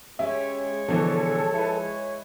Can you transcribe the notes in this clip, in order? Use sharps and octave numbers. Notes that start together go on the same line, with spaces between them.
G#3 C#4 G4 C#5 E5
B2 D3 E3 F3 A4
E4 B4